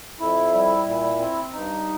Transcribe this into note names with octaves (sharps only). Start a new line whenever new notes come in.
F2 E4
G3
A#2
C4
G2 D#4